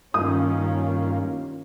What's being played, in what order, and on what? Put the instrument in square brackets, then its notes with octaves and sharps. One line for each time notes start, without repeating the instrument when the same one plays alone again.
[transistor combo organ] G2 A#3 F4 [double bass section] D#3 C#4 [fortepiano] D#6